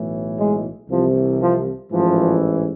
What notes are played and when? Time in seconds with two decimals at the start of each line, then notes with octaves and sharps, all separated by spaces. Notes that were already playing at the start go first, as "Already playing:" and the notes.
Already playing: B1 A2 E3
0.37 G#3
0.87 C2 C3 E3 F3
1.39 F3
1.89 A1 G#2 E3 F3